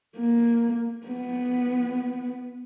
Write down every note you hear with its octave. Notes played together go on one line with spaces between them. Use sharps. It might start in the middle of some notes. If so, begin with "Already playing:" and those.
A#3
B3